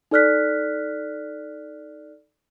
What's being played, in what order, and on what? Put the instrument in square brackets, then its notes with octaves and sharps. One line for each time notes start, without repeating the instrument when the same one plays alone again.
[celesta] D#4 A4 D5 F6 F#6 B6